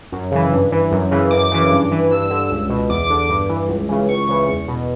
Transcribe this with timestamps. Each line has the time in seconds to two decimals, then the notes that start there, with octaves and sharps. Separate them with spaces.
0.12 F#2
0.32 C#3 E3
0.53 G2
0.72 E3
0.92 F#2
1.11 C#3 E3
1.31 F#2 D6
1.51 C#3 E3
1.71 G2
1.91 E3
2.11 G2 E6
2.30 D3
2.50 C#2
2.69 B2
2.90 E2 D6
3.10 D3
3.29 G2
3.49 E3
3.68 C#2
3.89 C#3 E3
4.08 C#2 C#6
4.29 C#3 E3
4.49 E2
4.68 B2